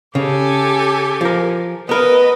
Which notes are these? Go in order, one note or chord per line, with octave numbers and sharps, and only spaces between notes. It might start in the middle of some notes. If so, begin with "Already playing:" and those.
C#3 G4 A4 G#5
F3 A#4
B3 A#4 B4 D#5